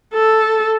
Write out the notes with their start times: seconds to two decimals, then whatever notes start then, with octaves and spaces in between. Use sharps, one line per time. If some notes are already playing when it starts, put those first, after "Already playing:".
0.14 A4